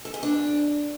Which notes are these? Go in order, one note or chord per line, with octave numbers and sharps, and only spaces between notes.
A4
G#4
D4